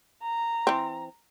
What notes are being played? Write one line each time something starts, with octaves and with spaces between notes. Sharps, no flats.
A#5
E3 C4